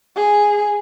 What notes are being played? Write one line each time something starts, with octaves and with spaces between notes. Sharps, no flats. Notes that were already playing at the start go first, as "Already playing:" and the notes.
G#4